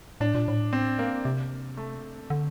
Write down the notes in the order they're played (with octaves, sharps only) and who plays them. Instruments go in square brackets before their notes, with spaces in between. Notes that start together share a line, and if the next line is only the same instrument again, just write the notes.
[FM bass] A2 [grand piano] D4
[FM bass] A#2
A2
[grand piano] C4
A#3
[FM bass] C3
[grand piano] A3
[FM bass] D3